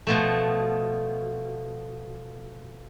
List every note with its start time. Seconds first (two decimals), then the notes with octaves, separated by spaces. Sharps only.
0.07 B2 F3 A3